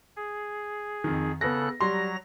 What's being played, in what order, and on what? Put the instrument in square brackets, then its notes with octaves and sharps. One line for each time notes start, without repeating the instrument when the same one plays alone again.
[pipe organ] G#4
[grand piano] F2 D#3
[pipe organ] C#3 A4 F#6 [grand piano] B3 A#6
[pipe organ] F#3 A#5 A#6 [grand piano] G3 C6